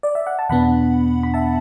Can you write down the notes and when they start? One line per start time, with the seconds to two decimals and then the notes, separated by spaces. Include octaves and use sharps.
0.03 D5
0.15 E5
0.27 F#5
0.39 A5
0.49 E2 B2 B3 D4 F#5 B5
1.23 B5
1.34 E5 A5